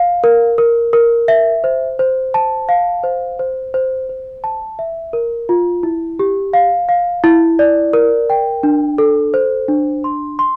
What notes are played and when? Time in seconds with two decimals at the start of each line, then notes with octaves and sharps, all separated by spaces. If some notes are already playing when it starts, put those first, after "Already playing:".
Already playing: F5
0.24 A#4
0.58 A#4
0.93 A#4
1.28 E5
1.64 C5
1.99 C5
2.34 A5
2.69 F5
3.04 C5
3.39 C5
3.74 C5
4.09 C5
4.44 A5
4.79 E5
5.13 A#4
5.49 F4
5.83 E4
6.19 G4
6.53 F5
6.89 F5
7.24 E4
7.59 D5
7.93 A#4
8.30 G5
8.63 D4
8.98 A4
9.34 C5
9.68 D4
10.04 C6
10.39 C6